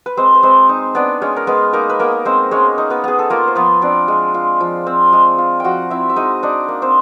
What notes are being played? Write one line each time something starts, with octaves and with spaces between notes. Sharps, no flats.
B4
G#3 C4 C5
B4
G#3 C4 C5
D#4
B3 D4 D5
G#3 C#4 C#5
A#4
G#3 B3 B4
A#3 D#4 A#4
B4
A#3 B3 A#4
G#3 C4 C5
G#3 C#4 C#5
D#4
B3 B4
B3 G#4
A4
A#3 F4 A#4
C5
F3 B3 B4
C4 D4 D5
G#3
F4
F3
C4
G#3
F4
F3 F#4 F#5 G5
C4 E4 E5
E5
G#3 D#4 D#5
D4 D#4 D5
A#3
C4 C5